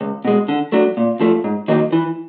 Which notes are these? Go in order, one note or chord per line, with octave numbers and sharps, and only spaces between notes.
C#2
B2 G#3
D3
F#3 A3 D4
A#2
F3 A3
G#2
D#3 F#3 A#3 D#4
E3